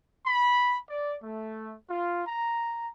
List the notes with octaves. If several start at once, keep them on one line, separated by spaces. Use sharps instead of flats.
B5
D5
A3
F4
A#5